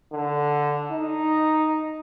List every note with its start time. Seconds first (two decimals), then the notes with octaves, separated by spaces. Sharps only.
0.13 D3
0.92 D#4